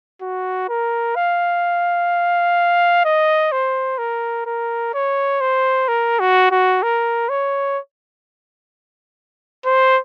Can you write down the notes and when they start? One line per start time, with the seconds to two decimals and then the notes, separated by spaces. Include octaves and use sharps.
0.22 F#4
0.69 A#4
1.16 F5
3.05 D#5
3.52 C5
3.99 A#4
4.46 A#4
4.94 C#5
5.41 C5
5.88 A#4
6.20 F#4
6.51 F#4
6.83 A#4
7.29 C#5
9.66 C5